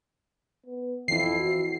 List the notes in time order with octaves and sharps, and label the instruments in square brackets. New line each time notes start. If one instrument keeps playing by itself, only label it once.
[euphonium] B3
[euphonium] F2 [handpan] E3 E4 [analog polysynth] C7
[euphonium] F#4